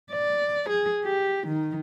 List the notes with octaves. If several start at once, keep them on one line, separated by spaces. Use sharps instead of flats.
D5
G#4
G4
D#3